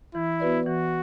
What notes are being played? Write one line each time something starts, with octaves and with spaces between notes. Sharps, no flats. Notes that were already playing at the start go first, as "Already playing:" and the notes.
E3 E4
B3 F#4 B4 D5
E3 F#4